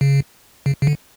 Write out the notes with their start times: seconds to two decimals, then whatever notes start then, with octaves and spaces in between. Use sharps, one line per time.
0.01 C#3
0.66 C#3
0.82 C#3
0.87 D3